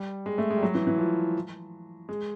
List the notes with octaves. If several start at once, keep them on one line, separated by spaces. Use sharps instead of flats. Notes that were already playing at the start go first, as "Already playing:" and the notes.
Already playing: G3
G#3
A3
G#3
G3
F#3
E3
E3
F3
G#3